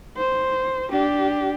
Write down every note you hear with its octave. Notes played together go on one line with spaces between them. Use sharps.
C5
D4 G4